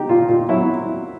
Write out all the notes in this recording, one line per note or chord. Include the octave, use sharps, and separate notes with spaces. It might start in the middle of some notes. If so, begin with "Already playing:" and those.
Already playing: D#4 G4
A#2 F4
A#2 F4
F#3 E4